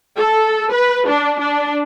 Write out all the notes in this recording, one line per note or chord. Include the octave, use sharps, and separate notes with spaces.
A4
B4
D4
D4